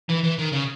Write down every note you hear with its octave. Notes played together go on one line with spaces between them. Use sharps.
E3
E3
D#3
C#3